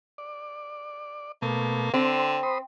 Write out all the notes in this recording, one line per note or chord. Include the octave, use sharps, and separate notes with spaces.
D5
B2 A3 A#3
D3 C4 C5
C5 B5 D#6